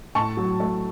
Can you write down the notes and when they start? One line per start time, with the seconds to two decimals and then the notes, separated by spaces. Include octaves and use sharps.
0.15 A2 A5 C#6
0.37 F#3
0.60 A3